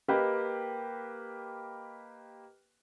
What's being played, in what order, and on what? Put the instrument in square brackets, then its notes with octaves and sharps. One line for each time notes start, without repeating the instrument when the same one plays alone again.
[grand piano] A#3 G4 B4 D#5